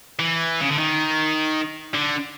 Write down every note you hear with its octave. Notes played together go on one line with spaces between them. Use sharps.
E3
C#3
D3
D#3
D3